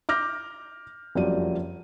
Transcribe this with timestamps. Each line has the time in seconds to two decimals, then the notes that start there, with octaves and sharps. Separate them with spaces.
0.09 D6 F6 G6 A#6
1.15 F#1 F2 F#3 G3 D5 D#7